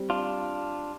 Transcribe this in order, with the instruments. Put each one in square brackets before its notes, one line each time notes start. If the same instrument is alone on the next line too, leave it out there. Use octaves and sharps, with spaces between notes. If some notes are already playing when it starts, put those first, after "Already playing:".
Already playing: [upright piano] G3 C4 G4 C5
[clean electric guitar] D4 F4